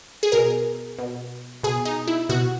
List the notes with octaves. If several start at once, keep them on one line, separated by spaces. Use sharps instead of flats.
G#4
B2 A#4
B2
B2 G#4
D#4
E4
B2 F#4